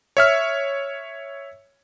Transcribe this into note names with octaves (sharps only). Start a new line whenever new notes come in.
C#5 E5 F6